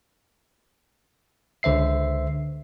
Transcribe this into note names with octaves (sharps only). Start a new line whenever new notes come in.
C#2 D3 C5 E5 C7